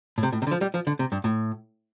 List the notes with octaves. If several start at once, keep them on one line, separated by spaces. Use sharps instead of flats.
A2
C3
A2
C3
D3
F3
G3
F3
D3
C3
G2
A2